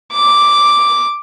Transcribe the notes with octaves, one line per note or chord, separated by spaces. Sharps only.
D6